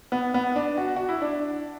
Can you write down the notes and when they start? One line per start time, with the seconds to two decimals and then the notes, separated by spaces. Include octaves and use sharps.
0.12 B3
0.34 B3
0.56 D4
0.78 F#4
0.96 F#4
1.09 E4
1.22 D4